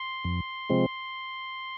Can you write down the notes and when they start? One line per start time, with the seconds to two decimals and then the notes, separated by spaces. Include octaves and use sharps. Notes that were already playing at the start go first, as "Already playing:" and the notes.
Already playing: C6
0.25 F2
0.70 C3 F3 G#3 C4